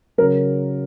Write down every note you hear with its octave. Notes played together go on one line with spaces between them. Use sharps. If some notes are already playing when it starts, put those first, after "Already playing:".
C#3 F#3 A#4